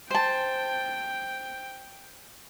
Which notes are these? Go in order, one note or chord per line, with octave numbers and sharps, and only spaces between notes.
C5 G5 A5